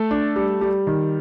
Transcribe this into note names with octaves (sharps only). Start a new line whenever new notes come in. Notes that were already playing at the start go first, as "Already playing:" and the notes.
Already playing: A3 A4
D4
G3
G3
D#3